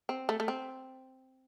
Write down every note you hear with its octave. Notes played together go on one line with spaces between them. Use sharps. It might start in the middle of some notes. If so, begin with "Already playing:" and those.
C4
A3
A3
C4